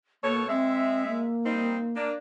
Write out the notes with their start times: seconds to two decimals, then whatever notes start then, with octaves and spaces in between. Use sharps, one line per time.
0.24 B2 A#3 A4 C#5
0.49 G#3 C4 E5
1.08 A#3
1.45 G3 C4 D#4
1.96 A#3 D4